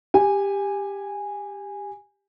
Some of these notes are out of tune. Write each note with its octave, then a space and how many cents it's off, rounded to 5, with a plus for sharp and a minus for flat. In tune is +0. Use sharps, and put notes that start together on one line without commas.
G4 +15 G#5 -10